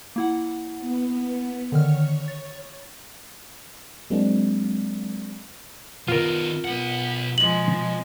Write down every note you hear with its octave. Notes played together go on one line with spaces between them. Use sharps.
A#3 E4 F#5
B3
D3 D#3 C#5 F6
A6
F#3 G#3 A#3 C4 D4
D#3 B3 F4 A#4
B1 B3 F#5
B2 F3 G#3 F#7